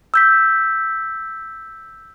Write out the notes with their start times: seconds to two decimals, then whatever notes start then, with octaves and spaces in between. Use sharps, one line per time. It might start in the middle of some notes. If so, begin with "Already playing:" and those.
0.14 E6 G6 B6